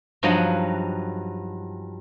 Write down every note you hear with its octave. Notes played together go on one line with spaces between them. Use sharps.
G2 F3 F#3 D#4 D#5 F#5